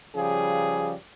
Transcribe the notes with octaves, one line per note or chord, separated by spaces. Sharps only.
C#3 F3 G3 G#4